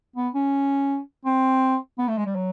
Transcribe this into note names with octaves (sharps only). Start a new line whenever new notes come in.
B3
C#4
C4
B3
A3
G#3
G3
F#3